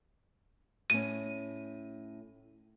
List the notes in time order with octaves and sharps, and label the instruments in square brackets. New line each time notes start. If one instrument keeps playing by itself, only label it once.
[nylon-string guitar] A2 C#4 [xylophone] D#7